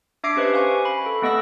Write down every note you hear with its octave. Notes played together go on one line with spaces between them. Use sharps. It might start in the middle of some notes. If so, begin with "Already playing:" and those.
D4 E5 D6 A#6 C7 D7
C#4 G4 B4 C5 D#5
F5 G#5 C#6
B5
A4
A3 B3 A4 D#5 E6 A#6